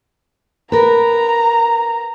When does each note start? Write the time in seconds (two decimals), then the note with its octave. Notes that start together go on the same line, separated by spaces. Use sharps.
0.72 A#4 B4 A#5